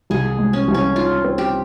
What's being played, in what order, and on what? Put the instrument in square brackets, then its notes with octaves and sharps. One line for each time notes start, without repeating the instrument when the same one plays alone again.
[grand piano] C2 [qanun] G#4
[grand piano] G#3
[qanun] C#4
[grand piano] C2
[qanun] C#4
[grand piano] D#4 [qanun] F4
[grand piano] C4
[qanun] G4